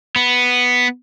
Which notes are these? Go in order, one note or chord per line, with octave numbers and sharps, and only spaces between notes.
B3